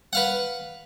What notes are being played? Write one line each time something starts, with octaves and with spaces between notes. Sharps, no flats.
B4 F5 F#5